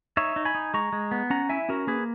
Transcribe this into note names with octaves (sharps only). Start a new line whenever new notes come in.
D#4 C#5 E5
D#4
G#5 B5
D#4
G#3 A#5 C#6
G#3
B3
C#4 F#5 A#5
E4 E5 G#5
C#4 F#4 A#4
A#3 G#4 B4